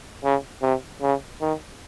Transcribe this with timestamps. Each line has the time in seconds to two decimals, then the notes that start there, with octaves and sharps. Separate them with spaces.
0.24 C#3
0.62 C3
1.02 C#3
1.41 D#3